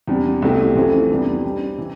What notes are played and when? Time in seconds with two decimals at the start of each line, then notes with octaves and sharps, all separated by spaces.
0.08 E2 C3 G3 D4
0.42 C2 B2 A3 E4 G4
0.75 F2 E3 A3
1.10 E2 C3 G3 B3 D4
1.44 B2 G3 D4
1.78 E3